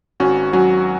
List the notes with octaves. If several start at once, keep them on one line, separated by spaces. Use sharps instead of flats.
G#1 C#4 F#4
F#3 C#4 F#4